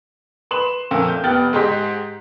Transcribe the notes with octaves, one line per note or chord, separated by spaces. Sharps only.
B4 C6 E7 F#7
F2 A#2 A3 A#4 E6
G6
F1 B3 G5 F6 F#6 A6
G#2 G4 G#4 D#5 C6 B6